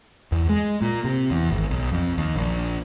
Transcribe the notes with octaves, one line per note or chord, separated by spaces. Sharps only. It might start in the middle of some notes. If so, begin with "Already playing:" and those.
E2
G#3
A#2
C3
E2
G#1
B1
F2
D#2
A#1